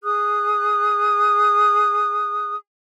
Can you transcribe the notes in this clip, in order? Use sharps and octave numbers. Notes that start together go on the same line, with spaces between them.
G#4 D#6 F#6